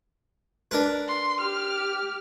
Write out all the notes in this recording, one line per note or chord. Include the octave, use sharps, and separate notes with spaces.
D4 A#4 B4
C6
G4 F6